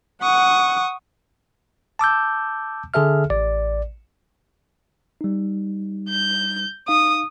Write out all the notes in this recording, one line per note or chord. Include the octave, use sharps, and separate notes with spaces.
F#5 C#6 D#6
A5 D6 E6 G6
D3 G#4 A4 E5 F6
A1 D5
G3 D#4
G6
D#4 F5 D#6